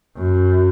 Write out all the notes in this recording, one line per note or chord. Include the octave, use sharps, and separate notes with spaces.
F#2